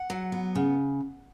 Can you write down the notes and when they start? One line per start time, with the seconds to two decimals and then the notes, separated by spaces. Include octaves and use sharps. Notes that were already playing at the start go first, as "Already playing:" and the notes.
Already playing: F#5
0.10 F#3
0.32 B3
0.55 C#3